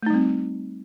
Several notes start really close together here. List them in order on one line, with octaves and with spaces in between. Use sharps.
A3 D#4 G3 C4